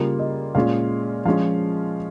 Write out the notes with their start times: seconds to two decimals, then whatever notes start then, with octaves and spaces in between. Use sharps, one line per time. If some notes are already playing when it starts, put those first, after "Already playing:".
Already playing: C#3 G3 A#3 F4
0.19 D#5
0.55 A#2 G#3 C#4 F4 F5
1.25 F3 G#3 C#4 F4 F5